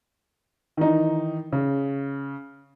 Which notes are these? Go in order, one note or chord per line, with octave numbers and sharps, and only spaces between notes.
D#3 E3 D#4
C#3